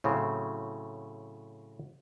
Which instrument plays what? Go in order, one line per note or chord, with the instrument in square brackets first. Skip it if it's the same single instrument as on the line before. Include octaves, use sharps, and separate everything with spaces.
[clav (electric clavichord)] A2 C#3 F#3 C4